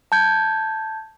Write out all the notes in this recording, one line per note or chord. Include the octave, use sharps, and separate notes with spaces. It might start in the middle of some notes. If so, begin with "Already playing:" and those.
A5 G6 G#6